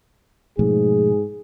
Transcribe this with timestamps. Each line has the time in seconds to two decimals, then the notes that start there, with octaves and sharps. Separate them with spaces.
0.59 G#2 B2 F3 A3 G#4